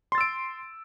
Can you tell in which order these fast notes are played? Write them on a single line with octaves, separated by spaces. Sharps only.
C6 A6 E6 D7